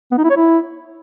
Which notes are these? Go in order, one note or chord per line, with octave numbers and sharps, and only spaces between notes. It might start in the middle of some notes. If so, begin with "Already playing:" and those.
B3
D#4
E4
C#5
E4